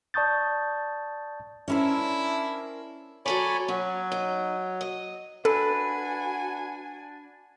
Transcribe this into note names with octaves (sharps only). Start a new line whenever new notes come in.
D5 A5 C#6 D#6 G6 A6
C#4 D4 E4 A#4 C5
F#3 A4 C#5 D5 G#5 B5
F#3 C#4
D#4
D#5
D4 F#4 A4 B4 G#5